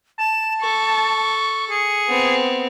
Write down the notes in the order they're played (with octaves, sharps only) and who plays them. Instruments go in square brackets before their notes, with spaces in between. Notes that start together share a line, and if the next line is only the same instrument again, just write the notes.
[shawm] A5 [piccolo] E7
[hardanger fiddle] A4 [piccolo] C#6
[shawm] G#4 [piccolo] C#7
[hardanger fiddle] B3 C4